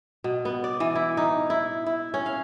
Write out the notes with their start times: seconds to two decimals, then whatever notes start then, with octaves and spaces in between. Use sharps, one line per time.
0.24 B2
0.45 B3
0.64 D5
0.80 E3
0.95 E4
1.17 D#4
1.50 E4
1.86 E4
2.14 C#4
2.26 F5